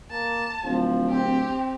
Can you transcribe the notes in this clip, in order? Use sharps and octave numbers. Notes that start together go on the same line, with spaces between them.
A#3 A5
D1 F3
C4 G4